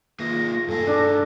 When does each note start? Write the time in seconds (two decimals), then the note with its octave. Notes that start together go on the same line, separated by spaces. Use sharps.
0.20 A#3 F4 G#4 B4 A#6
0.68 G2 G#4 A4
0.87 D4